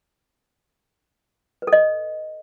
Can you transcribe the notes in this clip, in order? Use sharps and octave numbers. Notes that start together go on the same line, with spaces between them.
B4
A4
D#5